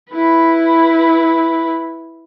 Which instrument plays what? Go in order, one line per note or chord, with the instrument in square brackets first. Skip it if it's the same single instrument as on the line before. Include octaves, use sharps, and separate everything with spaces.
[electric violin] E4 B4